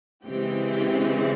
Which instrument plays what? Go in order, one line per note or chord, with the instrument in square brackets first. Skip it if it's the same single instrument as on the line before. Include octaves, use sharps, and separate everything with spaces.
[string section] C#3 E3 G#3 C4 G4